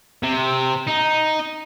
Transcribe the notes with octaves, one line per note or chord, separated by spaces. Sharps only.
C3
D#4